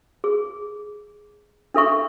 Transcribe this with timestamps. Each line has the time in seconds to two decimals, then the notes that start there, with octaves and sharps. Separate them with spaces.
0.24 G#4
1.74 D4 A4 E5 C#6